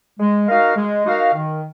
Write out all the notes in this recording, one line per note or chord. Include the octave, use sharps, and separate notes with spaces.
G#3
D#4 F#4 A#4 F5
G#3
D#4 F#4 A#4 F5
D#3